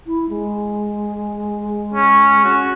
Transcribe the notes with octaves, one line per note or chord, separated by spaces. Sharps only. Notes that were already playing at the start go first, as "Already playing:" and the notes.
E4
G#3
C#4
C#4 F#4